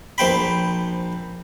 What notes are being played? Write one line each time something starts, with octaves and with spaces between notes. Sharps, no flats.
A#1 C5 G5 B5